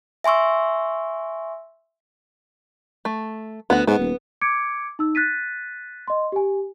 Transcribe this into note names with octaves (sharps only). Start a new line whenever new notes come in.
E5 G#5 C6 C#6 E6
A3
D2 B3 F#4
G#2 B3
D#1
D6 G#6 C#7 D7
D#4 E6
F#6 A6 B6 D#7
D#5 C6
G4 G#5